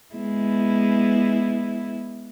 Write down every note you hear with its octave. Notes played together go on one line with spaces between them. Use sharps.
G#3 B3 E4